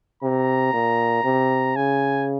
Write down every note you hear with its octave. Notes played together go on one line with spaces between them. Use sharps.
C3 A#5
A#2
C3
C#3 G#5